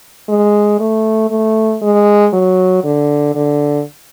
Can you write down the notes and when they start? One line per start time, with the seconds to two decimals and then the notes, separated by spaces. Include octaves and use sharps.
0.28 G#3
0.80 A3
1.30 A3
1.82 G#3
2.33 F#3
2.84 D3
3.35 D3